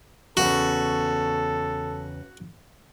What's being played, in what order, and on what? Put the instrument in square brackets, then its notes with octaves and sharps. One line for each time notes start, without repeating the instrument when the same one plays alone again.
[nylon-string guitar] E2 C#3 [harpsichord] F#4 [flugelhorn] A4